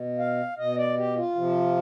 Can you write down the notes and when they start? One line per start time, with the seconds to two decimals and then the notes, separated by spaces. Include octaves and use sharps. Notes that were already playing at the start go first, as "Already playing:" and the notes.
Already playing: B2
0.19 F5
0.58 B2 D#5
0.77 D5
0.97 G4
1.16 F4
1.35 C3 F3